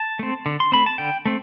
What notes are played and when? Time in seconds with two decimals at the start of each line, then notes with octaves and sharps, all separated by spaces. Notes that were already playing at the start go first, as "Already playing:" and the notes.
Already playing: A5
0.19 A3 C4
0.46 D3
0.60 C6
0.72 A3 C4 B5
0.86 A5
0.98 D3 G5
1.26 A3 C4